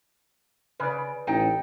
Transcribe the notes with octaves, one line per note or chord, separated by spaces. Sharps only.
C#3 B4 D5
A1 D#4 A4 G5